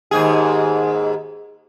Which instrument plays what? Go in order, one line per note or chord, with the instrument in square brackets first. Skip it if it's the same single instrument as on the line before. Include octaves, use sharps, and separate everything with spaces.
[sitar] D#2 G#2 G#4